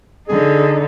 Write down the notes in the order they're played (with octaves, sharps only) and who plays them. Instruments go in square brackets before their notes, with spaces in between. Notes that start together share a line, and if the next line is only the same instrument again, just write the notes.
[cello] D3 D#4 [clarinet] G#4